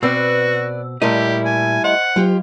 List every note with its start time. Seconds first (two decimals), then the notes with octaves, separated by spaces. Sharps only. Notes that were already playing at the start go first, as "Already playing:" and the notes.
0.03 B2 C4 F#4 B4 D5 E6
1.02 A#2 G3 A3 E4 G4 A#4 D#5
1.45 G#5
1.84 C5 D#5 F#5
2.16 F#3 F4 G4